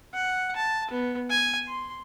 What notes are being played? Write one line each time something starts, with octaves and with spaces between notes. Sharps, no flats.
F#5
A5
B3
G#5
C6